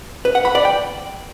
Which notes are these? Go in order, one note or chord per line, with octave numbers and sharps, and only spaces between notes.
B4
F#5
B5
D5
G5